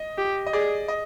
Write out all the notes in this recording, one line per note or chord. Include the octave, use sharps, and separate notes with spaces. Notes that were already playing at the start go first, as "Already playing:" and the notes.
Already playing: D#5
G4
D#5
G#4 D5
D#5